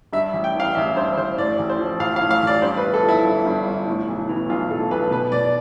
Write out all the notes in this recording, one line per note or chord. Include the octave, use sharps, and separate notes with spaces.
G2 E5
A1
G5
E3 F5
A1 E5
G2 C5
A1 C5
A2 D5
A1
C5
F3
A1 F5
F5
A2
F5
A1 D5
G2 C5
B4
G1
A4
F3
E4
G1
G2
G1
A2
B1
E3
B1 F4
A2 A4
B1 B4
B2 B4
B2 D5
D5